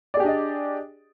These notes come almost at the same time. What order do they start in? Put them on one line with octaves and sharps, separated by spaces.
D5 G#4 G4 D4 D#5